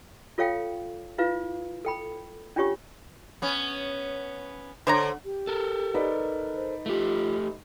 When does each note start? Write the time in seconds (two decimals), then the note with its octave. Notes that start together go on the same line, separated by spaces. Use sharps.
0.38 F4 A4 C#5 F5 G5
1.18 E4 F4 B4 F5
1.85 A4 G5 B5
2.56 C#4 D4 F4 G4 C#5 C#6
3.42 B3 C#4
4.87 D3 C5 C#5 A#5
5.24 G4
5.47 A4 A#4
5.94 D#4 B4 D5
6.55 C5
6.86 A3 F4 G4